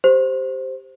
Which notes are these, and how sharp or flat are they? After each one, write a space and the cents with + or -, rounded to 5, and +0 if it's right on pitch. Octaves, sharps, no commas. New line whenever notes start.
G4 +0 C5 +0